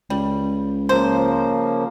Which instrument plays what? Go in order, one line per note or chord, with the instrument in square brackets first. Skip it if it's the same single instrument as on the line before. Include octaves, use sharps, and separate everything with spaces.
[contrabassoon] C#2 [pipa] G3
[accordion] C#3 F3 A#3 [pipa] C5